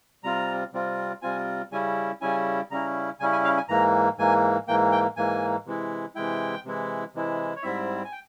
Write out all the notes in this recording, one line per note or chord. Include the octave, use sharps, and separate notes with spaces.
C3 G3 C4 F4 A#5
C3 G3 C4 F4
C3 G3 C4 F4 G#5
C#3 G3 C#4 E4 G#5
C#3 G3 C#4 E4 G#5
C#3 G3 C#4 E4 A#5
C#3 G3 C#4 E4 G#5
G#5
F5
G#5
G#2 E3 A#3 A#5
G#2 E3 A#3 G#5
G#2 E3 A#3 G5
G5
G#2 E3 A#3 G#5
C3 E3 G#3 E4
C3 E3 G#3 E4 G5
C3 E3 G#3 E4
C3 E3 G#3 E4
C#5
G#2 G3 C4 E4 E5
G#5
G5